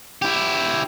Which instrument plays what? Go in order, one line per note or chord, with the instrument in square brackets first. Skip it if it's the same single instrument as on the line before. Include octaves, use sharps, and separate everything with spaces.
[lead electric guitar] E4 G4